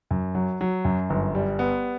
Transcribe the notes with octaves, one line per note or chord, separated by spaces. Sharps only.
F#2
F#3
F#3
F#2
G1
G3
B3